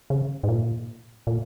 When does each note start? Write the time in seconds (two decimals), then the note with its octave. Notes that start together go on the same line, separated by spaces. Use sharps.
0.10 C#3
0.43 G#2
0.48 A#2
1.27 A#2